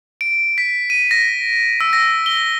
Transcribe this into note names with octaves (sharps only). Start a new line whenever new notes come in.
D7
B6
D#7
A#6
E6
A#6
G7